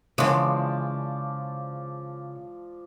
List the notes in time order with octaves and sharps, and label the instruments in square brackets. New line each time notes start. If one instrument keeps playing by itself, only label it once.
[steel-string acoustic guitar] C#3 [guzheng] E3 G#3 [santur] F3 D5